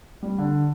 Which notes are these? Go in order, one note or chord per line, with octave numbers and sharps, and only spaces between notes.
G3
D3